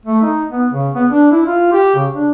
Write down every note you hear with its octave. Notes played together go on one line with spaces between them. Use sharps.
A3
D#4
B3
C#3
B3
D4
E4
F4
G4
C#3
D4